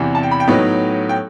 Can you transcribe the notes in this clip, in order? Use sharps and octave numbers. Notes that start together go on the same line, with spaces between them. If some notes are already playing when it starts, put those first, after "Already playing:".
Already playing: E2 C3 E3
A5
G5
B5
G5
A2 F#3 B3 D#4
G5